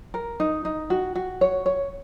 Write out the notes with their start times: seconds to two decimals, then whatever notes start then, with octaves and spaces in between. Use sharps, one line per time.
0.14 A#4
0.40 D#4
0.65 D#4
0.90 F#4
1.15 F#4
1.41 C#5
1.66 C#5